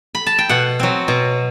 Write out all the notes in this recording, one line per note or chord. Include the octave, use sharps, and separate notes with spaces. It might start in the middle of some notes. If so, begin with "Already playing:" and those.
B5
A5
G5
B2 F#5
F#3 C4
B2